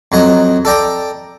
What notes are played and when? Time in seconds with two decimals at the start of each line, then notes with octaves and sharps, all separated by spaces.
0.12 F2 F#3 D#5 A#5
0.65 A4 D5 G5 A#5